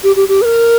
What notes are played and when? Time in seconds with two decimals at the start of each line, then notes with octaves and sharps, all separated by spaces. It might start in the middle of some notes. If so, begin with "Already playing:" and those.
0.03 G4
0.16 G4
0.28 G4
0.42 B4
0.45 A#4